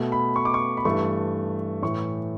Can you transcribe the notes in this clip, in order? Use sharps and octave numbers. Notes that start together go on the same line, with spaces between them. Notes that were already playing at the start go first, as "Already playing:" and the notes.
Already playing: B2 A3
B5
C#6
D6
C#6
B5
G2 E3 A3 C#6
A2 E3 A3 C#6